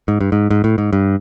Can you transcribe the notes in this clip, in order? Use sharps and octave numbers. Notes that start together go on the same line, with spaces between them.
G#2
G2
G#2
G#2
A2
G#2
G2